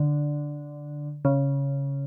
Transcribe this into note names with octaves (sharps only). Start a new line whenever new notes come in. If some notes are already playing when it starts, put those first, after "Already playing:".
Already playing: D3
C#3